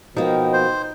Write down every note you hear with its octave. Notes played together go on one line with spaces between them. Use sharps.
B2 F3 A#3 D#4 G5
C5